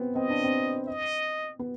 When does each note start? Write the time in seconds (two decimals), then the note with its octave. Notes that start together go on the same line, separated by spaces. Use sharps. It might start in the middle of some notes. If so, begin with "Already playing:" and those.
Already playing: B3 C4
0.15 C4 D#5
0.30 D4
0.44 C4
0.87 D#5
1.59 B3